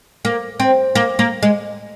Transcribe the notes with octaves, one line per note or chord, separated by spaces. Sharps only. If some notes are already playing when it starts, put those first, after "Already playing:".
A#3
C4
A#3
A#3
G#3